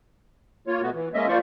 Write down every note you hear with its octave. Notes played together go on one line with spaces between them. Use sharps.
A#3 F4 C#5
B2 A3 B3 F#4
E3
G#3 A#3 C#4 D#5 E5
F3 A#3 F4 C5 D5 C#6